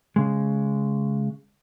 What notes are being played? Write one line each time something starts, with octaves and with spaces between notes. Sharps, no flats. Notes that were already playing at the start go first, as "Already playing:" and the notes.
C#3 G#3